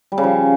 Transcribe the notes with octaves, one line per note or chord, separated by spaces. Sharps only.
G3
C#3
F3